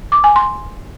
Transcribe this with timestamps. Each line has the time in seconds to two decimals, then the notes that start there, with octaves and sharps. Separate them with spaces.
0.12 D6
0.24 G#5
0.36 C6